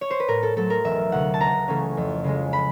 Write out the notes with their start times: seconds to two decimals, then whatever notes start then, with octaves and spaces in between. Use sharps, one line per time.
0.01 C#5
0.10 C5
0.20 B4
0.28 A2 A#4
0.43 A4
0.56 F#3 A3 A4
0.70 A#4
0.84 E1 E5
1.12 D2 C3 F#5
1.34 A5
1.40 C#2 A#5
1.68 C#3 E3 A3 C#4
1.97 F2
2.24 C#3 F3 G#3
2.53 B5